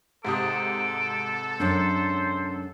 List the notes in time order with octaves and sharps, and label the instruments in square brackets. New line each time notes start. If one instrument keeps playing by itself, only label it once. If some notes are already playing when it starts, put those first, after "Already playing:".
[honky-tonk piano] G#2 C3 D#6 [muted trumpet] A4 [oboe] D6
[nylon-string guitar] F#2 C#4 D4 [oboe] C5